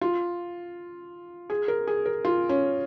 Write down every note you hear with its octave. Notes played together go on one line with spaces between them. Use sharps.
F4
G#4
A#4
G#4
A#4
F4
C#4